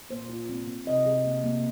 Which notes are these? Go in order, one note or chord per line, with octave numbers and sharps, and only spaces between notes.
A#2 C5
F4
C4
C4
C3 D#5
G#4
A#3
A#3